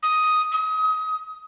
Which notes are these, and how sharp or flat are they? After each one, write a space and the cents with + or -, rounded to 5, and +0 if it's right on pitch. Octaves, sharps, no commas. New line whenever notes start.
D#6 +5
D#6 +30